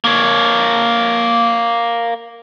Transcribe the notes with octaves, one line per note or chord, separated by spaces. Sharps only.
A#3 C#5